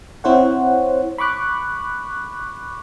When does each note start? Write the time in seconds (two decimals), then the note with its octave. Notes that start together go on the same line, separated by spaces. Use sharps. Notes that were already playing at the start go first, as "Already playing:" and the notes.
0.24 C4 E4 C5 C#5 F#5
1.18 B5 C#6 D6 F#6